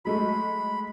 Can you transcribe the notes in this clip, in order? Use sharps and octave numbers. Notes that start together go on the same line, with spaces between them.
F#3 G#3 A3 B5